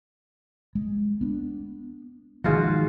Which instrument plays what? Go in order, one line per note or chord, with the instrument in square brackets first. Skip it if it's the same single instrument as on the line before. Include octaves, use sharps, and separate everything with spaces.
[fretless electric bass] G#3
B3 D4
[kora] G#2 F4 F#4 [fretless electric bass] D#3 F3